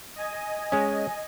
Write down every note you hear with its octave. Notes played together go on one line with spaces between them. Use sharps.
D#5 G#5
G#3 C#4